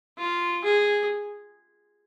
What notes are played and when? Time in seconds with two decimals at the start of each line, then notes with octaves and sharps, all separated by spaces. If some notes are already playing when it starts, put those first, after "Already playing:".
0.18 F4
0.64 G#4